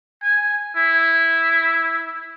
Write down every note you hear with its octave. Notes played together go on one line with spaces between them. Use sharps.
G#5
E4